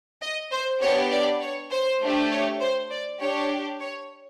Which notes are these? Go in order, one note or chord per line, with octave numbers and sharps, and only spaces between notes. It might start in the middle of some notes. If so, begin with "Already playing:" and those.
D#5
C5
B3 D4 G4 C#5
D5
C#5
C5
A3 D4 G4
C#5
C5
D5
D4 G4 C#5
C#5